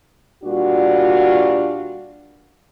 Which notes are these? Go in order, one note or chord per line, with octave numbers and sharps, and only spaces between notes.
A#2 G3 D4 F4 F#4